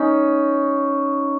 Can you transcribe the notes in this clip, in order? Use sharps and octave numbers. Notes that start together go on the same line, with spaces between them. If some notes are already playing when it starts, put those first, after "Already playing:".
Already playing: C#4 D#4